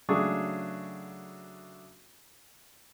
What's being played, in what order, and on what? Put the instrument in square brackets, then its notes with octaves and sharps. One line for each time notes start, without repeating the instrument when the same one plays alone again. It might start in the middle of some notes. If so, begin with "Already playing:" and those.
[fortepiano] C#3 F#3 A3 D4 F#4 G#4